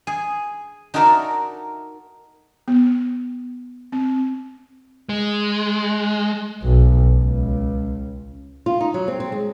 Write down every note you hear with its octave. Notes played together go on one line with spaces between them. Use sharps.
G#4
D#4 F#4 A4 A#4 D5 E5
B3
C4
G#3
B1
C#2
F4
D#4
F#3
C4
C4
G#3